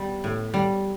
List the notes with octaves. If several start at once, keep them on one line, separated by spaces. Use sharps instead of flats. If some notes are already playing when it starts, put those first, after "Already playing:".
Already playing: G3 B3
A2
G3